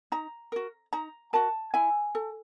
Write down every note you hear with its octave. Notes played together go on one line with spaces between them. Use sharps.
D#4 A#5
F#4 A#4
D#4 A#5
F#4 A#4 A5
E4 G#5
A4